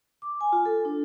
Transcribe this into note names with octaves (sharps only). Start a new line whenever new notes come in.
D6
G#5
F4
A4
D4